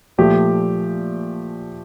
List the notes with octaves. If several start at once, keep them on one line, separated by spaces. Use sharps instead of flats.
A#2 F3 A3 G4